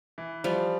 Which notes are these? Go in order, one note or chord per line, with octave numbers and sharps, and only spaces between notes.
E3
F3 G3